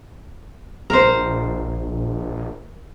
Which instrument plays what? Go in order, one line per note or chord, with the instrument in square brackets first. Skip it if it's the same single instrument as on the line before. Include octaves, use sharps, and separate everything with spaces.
[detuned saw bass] A#1 [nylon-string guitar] A#4 C5